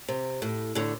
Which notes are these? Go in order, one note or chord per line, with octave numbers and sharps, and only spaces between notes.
C3
A2
A2 D3